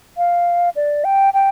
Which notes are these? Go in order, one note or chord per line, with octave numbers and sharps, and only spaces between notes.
F5
D5
G5
G5